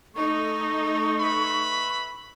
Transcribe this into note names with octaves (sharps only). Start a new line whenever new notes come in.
A3 D#4 A4 C#6
B4 E5 B5